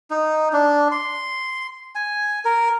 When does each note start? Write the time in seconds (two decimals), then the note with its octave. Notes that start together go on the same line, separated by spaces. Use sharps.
0.11 D#4
0.53 D4
0.92 C6
1.95 G#5
2.45 A#4